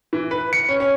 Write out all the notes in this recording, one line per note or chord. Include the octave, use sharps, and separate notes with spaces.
E3
B4
C#7
C#4
C#4